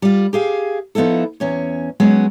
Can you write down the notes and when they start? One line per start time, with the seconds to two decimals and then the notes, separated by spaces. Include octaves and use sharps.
0.02 G3 F4
0.33 G4 G#4 F5
0.95 F3 B3 D#4 E4 A4
1.40 E2 C#4 C#5
2.00 F#3 G#3 B3 C#4